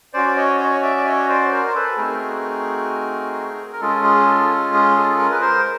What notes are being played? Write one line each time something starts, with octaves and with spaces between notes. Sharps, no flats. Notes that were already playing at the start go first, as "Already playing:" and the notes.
C#4 F#4 C5 D5
D5
C#5 D#5
C#5 D#5
D5 E5
D5
C#5 D#5
C5 D5
A#4 C5
C5
A4 B4
A3 C4 D#4 F#4 G#4 A#4
A#4
G#3 C#4 F4 G#4 A4
G#4
A4
G#4
G#4
A4
G#4 A#4
B4
A#4 C5